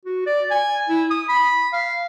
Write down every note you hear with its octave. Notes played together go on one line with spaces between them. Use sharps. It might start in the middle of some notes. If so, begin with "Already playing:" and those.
F#4
D5
G#5
E4
D#6
B5
F5